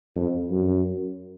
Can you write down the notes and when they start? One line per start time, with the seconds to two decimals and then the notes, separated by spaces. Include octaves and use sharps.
0.16 F2
0.51 F#2